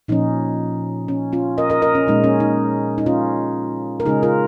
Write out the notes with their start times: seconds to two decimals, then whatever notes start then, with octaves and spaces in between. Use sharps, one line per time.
0.08 A#2 F3 C#4 D#4
1.08 C#4
1.33 C#4 F4
1.58 A#4 D#5
1.70 A#4 D#5
1.82 A#4 D#5
1.95 C#4
2.07 A#2 G#3 C#4 D#4
2.24 C#4
2.40 D#4
2.98 D#4
3.06 C#4 F4
4.00 A#4
4.06 C#3 G#3 C#4 D#4 G#4
4.23 F4 A#4